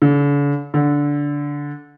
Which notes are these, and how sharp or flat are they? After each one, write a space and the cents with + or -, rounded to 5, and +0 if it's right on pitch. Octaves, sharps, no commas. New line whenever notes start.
D3 -45
D3 -15